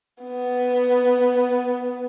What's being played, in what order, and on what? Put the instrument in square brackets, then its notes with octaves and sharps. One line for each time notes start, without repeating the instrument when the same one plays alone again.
[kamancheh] B3